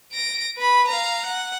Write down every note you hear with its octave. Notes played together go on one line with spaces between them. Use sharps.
A#6 D7
B4 B5
F5 A#5
F#5